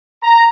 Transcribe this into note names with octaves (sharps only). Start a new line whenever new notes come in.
A#5